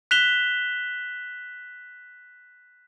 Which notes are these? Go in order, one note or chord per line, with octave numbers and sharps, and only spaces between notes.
F#6 B6 E7 F7 G7